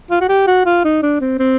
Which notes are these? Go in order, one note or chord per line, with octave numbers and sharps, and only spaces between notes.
F4
F#4
G4
F#4
F4
D#4
D4
C4
C4